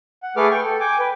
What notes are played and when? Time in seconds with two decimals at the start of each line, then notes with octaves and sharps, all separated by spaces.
0.23 F#5
0.37 A3 G#4 A4 B4 D6 F6
0.51 G5 C#6
0.64 A4
0.80 G5 G#5 D6
0.99 B4